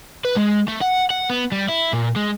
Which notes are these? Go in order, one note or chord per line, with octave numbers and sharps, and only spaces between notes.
B4
G#3
A3
F#5
F#5
B3
G3
E4
A#2
G#3